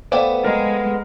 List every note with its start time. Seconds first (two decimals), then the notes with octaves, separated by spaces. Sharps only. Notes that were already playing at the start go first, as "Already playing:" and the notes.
0.12 A3 B3 B4 C5 D5 F5 G5
0.44 G#3 A#4